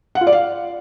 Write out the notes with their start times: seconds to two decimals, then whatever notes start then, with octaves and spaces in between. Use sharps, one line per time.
0.15 F#5
0.21 F4
0.27 D5
0.32 F5